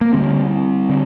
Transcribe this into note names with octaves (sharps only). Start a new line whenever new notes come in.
A#3
D2 D3 G3 C4
D3